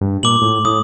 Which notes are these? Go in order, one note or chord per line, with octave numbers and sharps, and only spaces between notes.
G2
A#2 D6 F#7
A2
A2 D#6